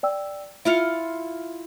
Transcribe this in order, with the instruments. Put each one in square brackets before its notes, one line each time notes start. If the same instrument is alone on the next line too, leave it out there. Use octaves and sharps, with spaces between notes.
[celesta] D5 G5 E6
[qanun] E4 F4 F5 [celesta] E5 C#7